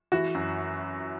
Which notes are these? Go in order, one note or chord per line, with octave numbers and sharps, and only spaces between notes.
E3 F#4
F#2